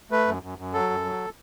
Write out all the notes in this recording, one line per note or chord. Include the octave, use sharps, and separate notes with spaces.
A3 B4
F#2
F#2
F#2
F#3 A4
F#2
F#3